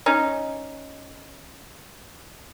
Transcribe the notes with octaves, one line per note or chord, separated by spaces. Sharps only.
C#4 D#4